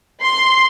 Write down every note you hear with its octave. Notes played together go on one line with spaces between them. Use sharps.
C6